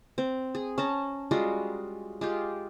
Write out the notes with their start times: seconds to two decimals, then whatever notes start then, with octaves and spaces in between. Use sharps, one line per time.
0.18 C4
0.55 G#4
0.78 C#4 A5 A#5
1.31 G3 G#3 F4 F#4
2.21 G#3 F4 G4